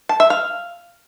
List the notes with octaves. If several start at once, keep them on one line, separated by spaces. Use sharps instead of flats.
A5
E5
F5